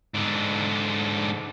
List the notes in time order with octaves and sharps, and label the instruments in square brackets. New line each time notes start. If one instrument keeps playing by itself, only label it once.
[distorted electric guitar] G#2 D3